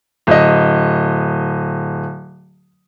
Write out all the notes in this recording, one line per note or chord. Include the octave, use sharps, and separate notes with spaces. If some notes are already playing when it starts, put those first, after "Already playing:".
D1 D#5